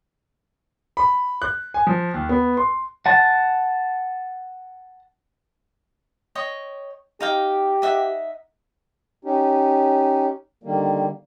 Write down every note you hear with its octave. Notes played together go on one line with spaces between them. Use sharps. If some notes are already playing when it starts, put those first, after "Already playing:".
B5
F#6
G#5
F3
D#2
B3
C6
F#5 A5
C#5 D#5 G5
D#4 G4 F5 G5
D#4 E5 F#5
C#4 D#4 G4
D3 D#3 G3 A#3